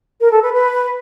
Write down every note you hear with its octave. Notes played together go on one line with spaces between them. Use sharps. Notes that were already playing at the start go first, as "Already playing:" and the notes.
A#4
A4
B4
B4